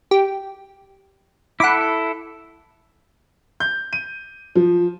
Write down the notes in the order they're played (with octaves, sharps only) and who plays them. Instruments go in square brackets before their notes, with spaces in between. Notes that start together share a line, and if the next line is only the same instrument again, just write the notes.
[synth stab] G4
[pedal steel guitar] E4 A4 [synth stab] F#5 B5 D6
[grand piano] G6
D#7
F3